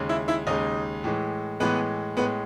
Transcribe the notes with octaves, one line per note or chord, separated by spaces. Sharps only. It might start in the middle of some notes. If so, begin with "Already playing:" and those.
Already playing: D#2 C#3 G#3
E4 E5
E4 E5
D#2 C#3 G#3 D#4 D#5
A2 E3 G#3
A2 E3 G#3 B3 B4
A2 G#3 B3 B4